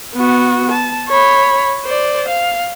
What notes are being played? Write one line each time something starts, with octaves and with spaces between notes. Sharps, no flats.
B3 F#4
A5
C#5 B5
C5 D5
F5